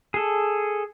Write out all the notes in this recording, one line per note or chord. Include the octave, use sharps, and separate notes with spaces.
G#4 A4